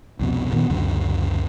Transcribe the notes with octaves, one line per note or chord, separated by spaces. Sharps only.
C2 F2 B2
A#2 D#3 B3
C#2 F#2 D3